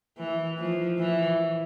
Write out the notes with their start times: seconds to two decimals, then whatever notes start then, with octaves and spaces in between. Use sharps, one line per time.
0.18 E3
0.58 F3
0.99 E3